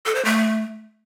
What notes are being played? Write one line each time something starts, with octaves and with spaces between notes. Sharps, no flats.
A4
C5
A3